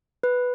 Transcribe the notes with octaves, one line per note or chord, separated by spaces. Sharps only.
B4